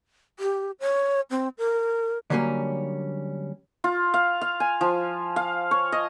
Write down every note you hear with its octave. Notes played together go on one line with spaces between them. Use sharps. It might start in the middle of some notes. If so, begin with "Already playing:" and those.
G4
C#5
C4
A#4
D3 F#3 G3 A#3 C#4
F4
F5
F5
G#5
F3
F5
C#5
D#5